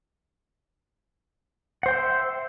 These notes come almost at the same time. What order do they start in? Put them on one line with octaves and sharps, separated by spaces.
F#5 C5 G5 C6 E5